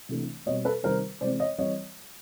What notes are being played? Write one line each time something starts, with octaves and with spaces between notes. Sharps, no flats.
C3 E3 A3 D4
B2 G3 C4 C#5 D#5
A4 B4
C3 D#3 G3 A#4 C5
C3 E3 G#3 C4 C5 D5
C#5 D#5
E3 G3 C4 C#5 D#5